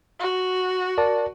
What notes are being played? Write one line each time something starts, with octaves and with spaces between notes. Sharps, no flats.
F#4
A#4 D5 A5